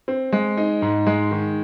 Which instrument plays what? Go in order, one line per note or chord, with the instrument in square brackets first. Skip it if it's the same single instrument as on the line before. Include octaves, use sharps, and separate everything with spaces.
[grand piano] C4
G#3
D#4
G#2
G#3
D#3